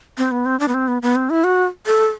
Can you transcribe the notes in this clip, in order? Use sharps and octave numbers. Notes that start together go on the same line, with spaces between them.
C4
B3
C4
D4
B3
C4
B3
B3
C4
E4
F#4
A4